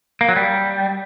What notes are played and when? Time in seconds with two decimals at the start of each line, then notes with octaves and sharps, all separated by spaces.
0.21 A#3
0.29 F#3
0.36 G3